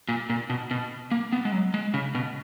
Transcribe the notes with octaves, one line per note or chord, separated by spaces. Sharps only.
A#2
A#2
B2
B2
A#3
B3
G#3
F#3
G#3
C#3
B2